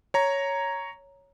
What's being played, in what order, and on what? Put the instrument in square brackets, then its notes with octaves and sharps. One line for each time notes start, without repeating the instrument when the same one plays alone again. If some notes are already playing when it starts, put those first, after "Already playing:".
[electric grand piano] C#5 A#5